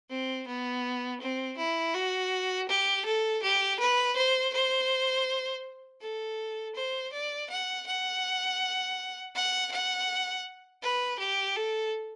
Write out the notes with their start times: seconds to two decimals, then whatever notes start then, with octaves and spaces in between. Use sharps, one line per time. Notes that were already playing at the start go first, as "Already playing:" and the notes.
0.10 C4
0.47 B3
1.21 C4
1.57 E4
1.94 F#4
2.69 G4
3.06 A4
3.43 G4
3.80 B4
4.16 C5
4.54 C5
6.01 A4
6.76 C5
7.13 D5
7.50 F#5
7.87 F#5
9.35 F#5
9.72 F#5
10.83 B4
11.19 G4
11.56 A4